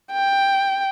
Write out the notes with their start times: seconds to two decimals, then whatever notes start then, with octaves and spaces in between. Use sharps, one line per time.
0.12 G5